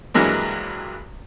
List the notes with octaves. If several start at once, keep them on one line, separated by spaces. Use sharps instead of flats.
G2 E3 F#3 G#3 A#3